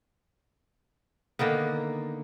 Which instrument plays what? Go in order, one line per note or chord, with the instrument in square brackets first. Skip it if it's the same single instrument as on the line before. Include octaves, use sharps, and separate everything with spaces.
[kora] D3 D#3 A#3 B3